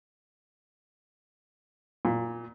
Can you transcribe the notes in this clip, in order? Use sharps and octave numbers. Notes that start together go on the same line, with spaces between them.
A#2